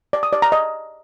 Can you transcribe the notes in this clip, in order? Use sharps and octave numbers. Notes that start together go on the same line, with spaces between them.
D5
D#6
D5
A#5
D#5